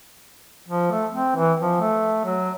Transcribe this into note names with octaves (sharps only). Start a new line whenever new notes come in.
F3
A3
C4
E3
F3
A3
F#3